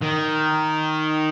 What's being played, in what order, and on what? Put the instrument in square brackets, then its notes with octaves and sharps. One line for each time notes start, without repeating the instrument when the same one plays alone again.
[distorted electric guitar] D#3